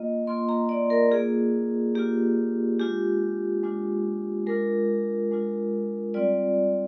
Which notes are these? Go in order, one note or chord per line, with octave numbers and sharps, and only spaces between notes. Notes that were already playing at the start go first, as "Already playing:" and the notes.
Already playing: A#3 F4 D#5
A#3 F4 C6
A#5
D5
A#4
A#3 D4 F4 G#4
A#3 D4 F4 G4
G#3 D4 F4 G4
G#3 D4 F4
G#3 D4 F4 A#4
G#3 D4 F4
G3 C4 F4 D5